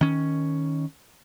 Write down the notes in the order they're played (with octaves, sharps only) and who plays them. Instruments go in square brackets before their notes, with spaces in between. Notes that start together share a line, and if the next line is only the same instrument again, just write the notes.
[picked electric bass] D#3 C#4